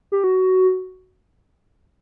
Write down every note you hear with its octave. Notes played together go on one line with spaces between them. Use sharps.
G4
F#4